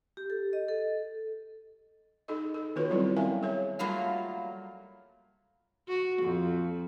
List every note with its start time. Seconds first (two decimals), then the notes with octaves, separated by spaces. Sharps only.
0.17 G4
0.30 A4
0.53 D#5
0.69 A4
2.28 D#4 G#4 A4 D#5
2.54 A4
2.76 D#3 B3 F4 F#4 B4 C#5
2.90 F#3 G3 C4 C#4 E4 F4
3.17 A#4 E5 F5 G5 G#5
3.43 G#4 C#5 E5
3.79 F#3 G3 A3 A#3 F4 F5
5.88 F#4
6.22 F2